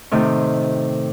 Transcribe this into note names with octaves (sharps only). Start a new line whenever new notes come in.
A2 C3 D#3